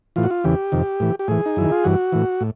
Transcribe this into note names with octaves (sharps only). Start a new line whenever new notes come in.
A2 E3 F4
F#4
F4
E2 C#3 E3 G4
F2 C3 D#3
A2 E3
G4
A2 E3 G#4
D#4
F#2 D#3 E4
F4
G2 E3 F#4
A2 E3
A2